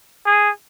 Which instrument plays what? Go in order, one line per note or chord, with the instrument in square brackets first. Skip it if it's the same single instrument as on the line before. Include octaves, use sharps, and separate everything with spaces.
[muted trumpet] G#4